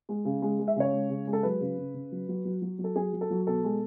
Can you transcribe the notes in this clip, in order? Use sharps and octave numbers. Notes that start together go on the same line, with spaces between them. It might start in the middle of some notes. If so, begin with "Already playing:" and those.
G#3
C#3
G#3
G#3
E5
C#3 C#5
G#3
C#3
G#3
A4
F#3 B4
C#3
C#3
C#3
F#3
F#3
F#3
F#3
F#3
A4
F#3 G#4
F#3
A4
F#3
B2 A4
G#3